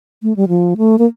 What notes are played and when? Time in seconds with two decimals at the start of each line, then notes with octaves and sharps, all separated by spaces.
0.23 A3
0.36 G3
0.48 F3
0.77 A3
0.98 A#3